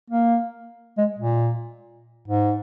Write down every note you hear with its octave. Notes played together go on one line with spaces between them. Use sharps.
A#3
G#3
A#2
G#2